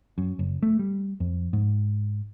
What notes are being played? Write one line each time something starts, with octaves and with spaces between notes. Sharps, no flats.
F#2
F#1
A3
G3
F2
G#2